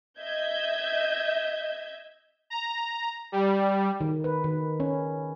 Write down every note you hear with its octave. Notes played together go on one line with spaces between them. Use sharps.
D#5 E5 G6 G#6
A#5
G3
D#3
B4
D#3
C#4